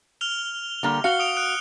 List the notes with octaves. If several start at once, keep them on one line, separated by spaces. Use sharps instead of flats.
F6 F7 G7
D3 G3 A#3
F#4 F5 C#7 G7
D#6 D7 F7
D#6 F#6 D7